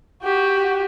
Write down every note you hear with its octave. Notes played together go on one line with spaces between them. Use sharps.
F#4 G4